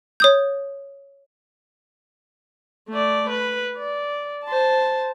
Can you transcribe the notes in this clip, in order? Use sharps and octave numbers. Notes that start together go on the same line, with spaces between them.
C#5 D#6 G6
A3 D5
B4
D5
C5 A5